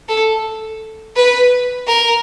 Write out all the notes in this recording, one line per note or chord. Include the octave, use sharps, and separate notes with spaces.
A4
B4
A#4